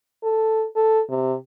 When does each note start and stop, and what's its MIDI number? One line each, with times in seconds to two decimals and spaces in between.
0.23 0.65 69
0.76 1.01 69
1.09 1.35 48